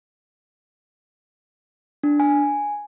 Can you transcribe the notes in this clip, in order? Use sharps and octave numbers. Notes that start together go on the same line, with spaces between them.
D4
G#5